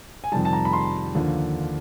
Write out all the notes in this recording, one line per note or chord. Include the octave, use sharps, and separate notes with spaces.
G#5
F2 C3 D#3 G3 A5
A5
A#5
B5
C6
D#2 D3 F3